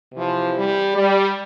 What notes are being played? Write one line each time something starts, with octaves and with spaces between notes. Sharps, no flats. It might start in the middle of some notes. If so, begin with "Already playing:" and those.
C3 E3 F3
G3
G3